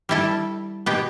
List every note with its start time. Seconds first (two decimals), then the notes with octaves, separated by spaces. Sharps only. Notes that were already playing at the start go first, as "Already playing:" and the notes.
0.09 G3 E4 A4
0.86 B2 B3 G4